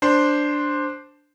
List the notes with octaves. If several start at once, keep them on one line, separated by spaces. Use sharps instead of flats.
D4 C5 C6